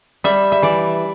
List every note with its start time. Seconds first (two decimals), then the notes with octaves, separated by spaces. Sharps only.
0.24 G3 E5
0.52 E5
0.62 E3 D5